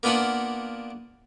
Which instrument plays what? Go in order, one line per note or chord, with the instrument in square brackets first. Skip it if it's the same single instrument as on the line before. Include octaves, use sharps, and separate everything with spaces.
[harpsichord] A#3 B3 D4 F4 B4 F#5